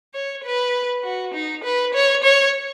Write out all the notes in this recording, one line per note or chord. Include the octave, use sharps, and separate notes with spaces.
C#5
B4
F#4
D#4
B4
C#5
C#5